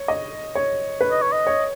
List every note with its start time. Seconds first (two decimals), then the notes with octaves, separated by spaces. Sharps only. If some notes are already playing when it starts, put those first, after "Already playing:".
Already playing: C#5
0.08 D#5
0.55 C#5
1.01 B4
1.11 D#5
1.22 C#5
1.32 D#5
1.47 C#5